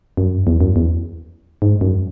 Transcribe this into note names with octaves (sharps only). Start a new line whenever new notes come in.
F#2
E2
F#2
E2
G#2
F#2